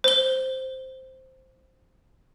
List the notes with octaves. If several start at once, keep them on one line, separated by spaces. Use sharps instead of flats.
C5 G7